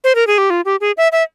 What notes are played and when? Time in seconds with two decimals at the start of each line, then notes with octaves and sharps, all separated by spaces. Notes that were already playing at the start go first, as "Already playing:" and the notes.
0.04 C5
0.15 A#4
0.27 G#4
0.38 G4
0.50 F4
0.65 G4
0.81 G#4
0.97 E5
1.12 E5